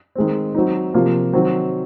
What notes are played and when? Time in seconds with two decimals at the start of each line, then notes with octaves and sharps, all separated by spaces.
0.15 D#3 G#3 C4
0.55 F#3 C4 D#4
0.94 C3 F3 A#3 F4
1.33 D#3 F#3 C4